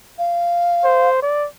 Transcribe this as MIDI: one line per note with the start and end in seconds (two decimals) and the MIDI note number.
0.18 1.08 77
0.84 1.20 72
1.22 1.47 74